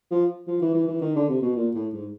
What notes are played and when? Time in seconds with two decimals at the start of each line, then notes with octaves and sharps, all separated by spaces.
0.11 F3
0.48 F3
0.62 E3
0.74 E3
0.88 E3
1.02 D#3
1.16 D3
1.29 C3
1.42 B2
1.56 A#2
1.75 A2
1.93 G#2